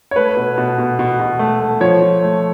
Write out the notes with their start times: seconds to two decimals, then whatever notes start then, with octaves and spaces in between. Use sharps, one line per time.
0.11 C#5
0.16 A3 B4
0.37 B2
0.58 B2
0.78 B2
0.99 B2
1.20 B2
1.39 A3
1.60 A3
1.80 F3 C#5
2.01 F3
2.22 A3